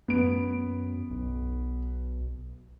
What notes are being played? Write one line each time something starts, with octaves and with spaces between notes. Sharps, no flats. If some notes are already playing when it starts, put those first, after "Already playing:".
F#2 B3 D7
B1